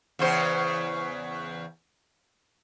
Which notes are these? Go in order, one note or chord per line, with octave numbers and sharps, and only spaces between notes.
E2 C#3 C5